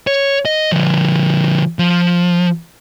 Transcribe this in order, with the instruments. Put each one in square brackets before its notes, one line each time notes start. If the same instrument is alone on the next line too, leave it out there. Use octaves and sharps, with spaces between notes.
[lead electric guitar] C#5
D#5
D3 F3
F3